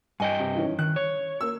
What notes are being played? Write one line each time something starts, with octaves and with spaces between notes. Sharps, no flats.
G2 D#5 G5 G#5
C3
D#3 E3 C#4
D#3 F#6
C#5
A#3 E6